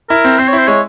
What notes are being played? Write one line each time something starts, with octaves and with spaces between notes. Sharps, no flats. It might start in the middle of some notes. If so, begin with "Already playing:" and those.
E4 A#4
C4
C4 C5
C#5
E4
C5
G#3 C#5